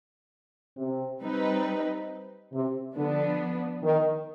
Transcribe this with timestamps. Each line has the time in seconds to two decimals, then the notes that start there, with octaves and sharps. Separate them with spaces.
0.77 C3
1.22 G3 C4 D#4 B4
2.53 C3
2.96 D3 F3 B3 D4
3.83 D#3